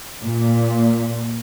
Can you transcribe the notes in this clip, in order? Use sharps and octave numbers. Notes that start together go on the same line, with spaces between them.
A#2